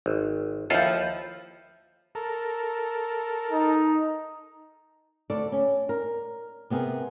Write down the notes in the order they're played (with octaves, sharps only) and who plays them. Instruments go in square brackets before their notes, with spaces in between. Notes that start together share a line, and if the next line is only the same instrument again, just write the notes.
[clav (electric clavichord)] G#1
[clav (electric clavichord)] D#2 F4 A4 [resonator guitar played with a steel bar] F3 E4
[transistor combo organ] A4 A#4
[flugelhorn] D#4
[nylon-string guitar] D2 A4 D5
C#4
A#4
C3 B3 G#4 A#4